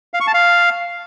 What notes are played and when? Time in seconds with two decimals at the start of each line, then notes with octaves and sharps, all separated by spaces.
0.14 F5
0.20 C#6
0.27 A5
0.34 F5